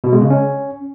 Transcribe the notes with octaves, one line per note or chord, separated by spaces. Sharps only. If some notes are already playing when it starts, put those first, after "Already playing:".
B2
G#3
C#3
C#4